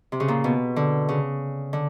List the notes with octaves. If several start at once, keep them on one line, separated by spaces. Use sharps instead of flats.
C3
C#3
A#2
B2
D3
C#3
D3